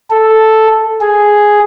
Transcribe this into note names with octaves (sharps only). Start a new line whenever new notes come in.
A4
G#4